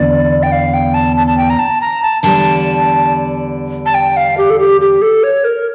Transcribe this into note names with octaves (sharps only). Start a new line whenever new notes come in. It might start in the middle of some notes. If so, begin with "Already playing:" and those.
Already playing: E2 D3 D5
G5
F5
G5
A5
A5
A5
G5
A#5
A5
A#5
A5
E2 D3 G3 D4 A5
A5
G5
F5
G4
A4
G4
G4
A4
C#5
A#4